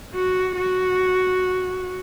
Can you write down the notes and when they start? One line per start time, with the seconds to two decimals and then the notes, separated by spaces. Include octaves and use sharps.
0.14 F#4
0.56 F#4